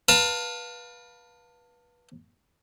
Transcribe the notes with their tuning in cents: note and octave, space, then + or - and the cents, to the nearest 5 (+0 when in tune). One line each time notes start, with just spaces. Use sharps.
B4 -20 F5 +20 A5 +30